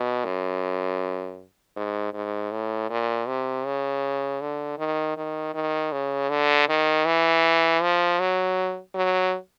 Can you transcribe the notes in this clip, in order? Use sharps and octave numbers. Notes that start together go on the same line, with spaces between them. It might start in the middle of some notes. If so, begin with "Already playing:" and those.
Already playing: B2
F#2
G#2
G#2
A2
A#2
C3
C#3
D3
D#3
D#3
D#3
C#3
D3
D#3
E3
F3
F#3
F#3